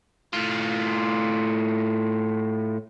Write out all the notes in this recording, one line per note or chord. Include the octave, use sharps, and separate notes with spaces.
A2 F4